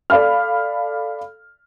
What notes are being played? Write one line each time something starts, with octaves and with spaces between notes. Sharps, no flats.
A4 D5 F5 B5 F6